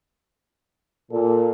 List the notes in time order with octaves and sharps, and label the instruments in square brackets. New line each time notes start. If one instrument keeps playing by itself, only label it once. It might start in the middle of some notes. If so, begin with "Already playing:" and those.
[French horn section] A#2 [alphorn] A4